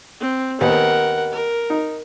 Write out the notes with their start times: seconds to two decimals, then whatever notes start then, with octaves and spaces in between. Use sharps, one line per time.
0.20 C4
0.61 D#2 B3 A#4 C5 F#5
1.32 A#4
1.70 D#4